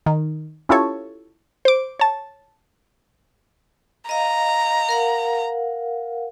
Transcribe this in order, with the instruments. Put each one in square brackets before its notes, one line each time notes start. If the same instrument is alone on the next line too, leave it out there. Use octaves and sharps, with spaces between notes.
[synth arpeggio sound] D#3
C#4 E4 F4 G4 A4 C#5
C5 D6
C#5 A5
[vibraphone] D#5 F5 [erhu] A#5
[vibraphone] A#4 F5 F#5